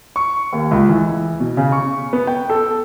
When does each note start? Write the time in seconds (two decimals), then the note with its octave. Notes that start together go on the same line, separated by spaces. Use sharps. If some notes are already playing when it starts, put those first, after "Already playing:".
0.16 C#6
0.53 D#2
0.71 C#2
0.89 E3
1.40 B2
1.57 C#3
1.72 C#6
2.13 B3
2.27 G5
2.50 A4